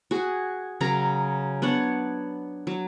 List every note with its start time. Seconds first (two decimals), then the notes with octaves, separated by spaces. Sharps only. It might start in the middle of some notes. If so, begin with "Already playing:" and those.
0.11 F#4 G#4
0.81 C#3 F#3 A#4 A#5
1.62 B3 D4 C#5 F#5
2.67 F#3